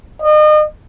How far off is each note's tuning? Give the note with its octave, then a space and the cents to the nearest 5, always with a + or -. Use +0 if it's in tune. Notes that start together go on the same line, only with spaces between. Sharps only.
D#5 -35